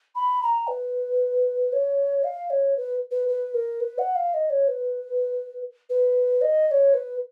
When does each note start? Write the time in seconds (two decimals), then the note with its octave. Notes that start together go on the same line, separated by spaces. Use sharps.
0.15 B5
0.42 A#5
0.67 B4
1.72 C#5
2.23 F5
2.50 C#5
2.77 B4
3.11 B4
3.28 B4
3.54 A#4
3.80 B4
3.98 F#5
4.15 F5
4.33 D#5
4.50 C#5
4.68 B4
5.89 B4
6.41 D#5
6.67 D#5
6.71 C#5
6.94 B4